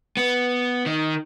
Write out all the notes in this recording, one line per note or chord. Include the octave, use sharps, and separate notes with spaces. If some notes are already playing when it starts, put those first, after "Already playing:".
B3
D#3